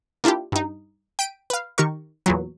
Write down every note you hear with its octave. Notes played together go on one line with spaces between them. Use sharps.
A#3 D4 E4 F4 G4
G2 D#4
G5 B6 D7 D#7
B4 F5
D#3 G4 A#4 C#6
E2 A#2 F#3